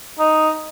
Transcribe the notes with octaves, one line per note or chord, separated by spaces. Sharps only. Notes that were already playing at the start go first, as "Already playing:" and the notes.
D#4